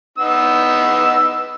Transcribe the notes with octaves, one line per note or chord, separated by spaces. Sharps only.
B3 D#4 E6